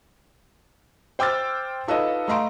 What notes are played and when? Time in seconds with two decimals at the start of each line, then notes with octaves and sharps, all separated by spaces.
1.19 C5 G5 D6 E6 F6 A6
1.88 D#4 F4 A4 B4 C#5 D#5
2.28 A3 D#5 F5 A#5 C6 D7